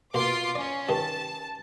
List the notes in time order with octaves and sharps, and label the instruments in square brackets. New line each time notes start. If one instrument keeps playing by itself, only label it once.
[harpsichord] B2 A#3 [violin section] F4 C6 D6
[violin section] C#4 [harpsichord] D5
[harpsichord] G2 D#3 [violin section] A5